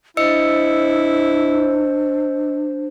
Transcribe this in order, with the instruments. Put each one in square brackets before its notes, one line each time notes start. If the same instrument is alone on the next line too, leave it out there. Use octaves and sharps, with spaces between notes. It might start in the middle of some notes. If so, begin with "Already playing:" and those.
[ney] D4 [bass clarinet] E4 [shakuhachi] C5 [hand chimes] D#5 E6 C#7